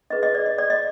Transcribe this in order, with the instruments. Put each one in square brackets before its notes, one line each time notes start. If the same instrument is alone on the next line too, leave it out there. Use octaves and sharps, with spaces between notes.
[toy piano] D4 G#4 B4 D#5
D#5
D5
D#5
D5
D#5